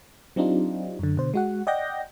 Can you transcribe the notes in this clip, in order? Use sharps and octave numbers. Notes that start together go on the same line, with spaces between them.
F#3 C4 D4 D#4 F4 G4
F#2 D3
B2 D3 C5
G#3 F#4 F#5
D5 D#5 F#5 G5 G6 A#6